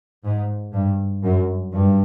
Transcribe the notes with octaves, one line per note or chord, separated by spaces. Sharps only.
G#2
G2
F#2
G2